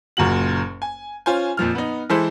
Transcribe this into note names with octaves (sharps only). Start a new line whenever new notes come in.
F#1 F#2 A#2 F#4 F#7
G#5
C#4 F4 C5 G#5
F2 A#2 F3 F6
B3 D#4
E3 G#3 E4 A4 C5